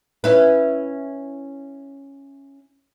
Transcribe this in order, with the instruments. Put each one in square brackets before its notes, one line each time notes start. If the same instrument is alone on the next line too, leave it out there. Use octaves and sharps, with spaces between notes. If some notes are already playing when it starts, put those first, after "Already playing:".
[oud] C#4 E4 B4